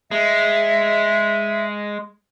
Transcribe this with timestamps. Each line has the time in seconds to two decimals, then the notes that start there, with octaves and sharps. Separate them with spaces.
0.11 G#3 E5